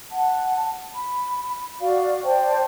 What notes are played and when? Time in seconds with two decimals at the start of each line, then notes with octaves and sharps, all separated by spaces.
0.11 F#5 A5
0.95 B5
1.81 F#4 D5 F5
2.24 C5 D5 G5 A5